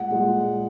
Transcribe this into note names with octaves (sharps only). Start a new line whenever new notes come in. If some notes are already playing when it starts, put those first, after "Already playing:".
Already playing: A#2 G#3 F#5
A#2 G#3